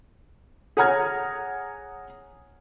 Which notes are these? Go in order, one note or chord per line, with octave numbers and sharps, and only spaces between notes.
G#4 C#5 F#5 A#5 F6 G#6